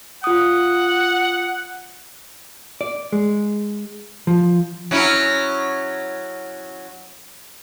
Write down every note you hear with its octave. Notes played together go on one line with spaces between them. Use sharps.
F4 F#5 D#6
D5
G#3
F3
F#3 C#4 E4